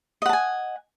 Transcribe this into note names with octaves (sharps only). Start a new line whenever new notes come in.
D#5 F#5 G#5 A5